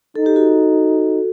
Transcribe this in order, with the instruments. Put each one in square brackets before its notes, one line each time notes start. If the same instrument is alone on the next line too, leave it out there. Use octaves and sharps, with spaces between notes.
[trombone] D#4 [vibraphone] A4
[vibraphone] G4
F#4 A4